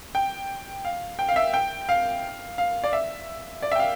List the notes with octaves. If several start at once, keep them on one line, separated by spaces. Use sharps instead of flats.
G5
F5
G5
F5
E5
G5
F5
F5
D5
E5
D5
E5
G5
F5